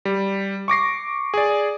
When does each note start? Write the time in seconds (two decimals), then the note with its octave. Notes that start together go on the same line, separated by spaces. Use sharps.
0.05 G3
0.68 C#6 D6 A#6 C7
1.34 G#4 D5